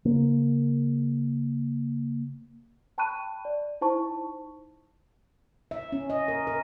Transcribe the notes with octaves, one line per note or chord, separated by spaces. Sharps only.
C#3 A#3
G5 A5 B5 C#6 F#6 D#7
D5
D#4 E4 C5 A5 C#6
E5
C#4
D#5
A#4
A#4